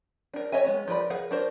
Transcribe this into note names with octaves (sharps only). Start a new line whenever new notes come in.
D4 A#4
C#5 D#5 E5 G#5
G#3 B3 C#4
F3 A#4 B4 D5 B5
G#4 A#4 B4 F5 F#5
D4 F#4 A#4 C5 D5